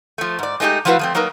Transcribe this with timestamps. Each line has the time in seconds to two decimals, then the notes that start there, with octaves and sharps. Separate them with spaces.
0.18 F3 A3
0.39 G#2 D5
0.60 G#3 A3 D#4 E4 G4
0.85 F3 A3 E4 F#4 B4 F5
0.99 F3 A3 C4
1.15 F#3 A#3 D#4 A#4 B4